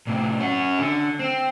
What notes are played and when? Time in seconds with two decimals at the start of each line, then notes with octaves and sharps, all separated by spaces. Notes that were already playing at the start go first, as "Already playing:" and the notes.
0.07 A2 C3
0.40 C#4 F#4
0.79 D3
1.19 C4